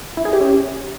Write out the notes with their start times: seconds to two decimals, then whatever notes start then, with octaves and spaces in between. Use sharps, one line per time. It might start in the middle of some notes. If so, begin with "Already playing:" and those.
0.17 E4
0.25 G#4
0.33 G4
0.41 C#4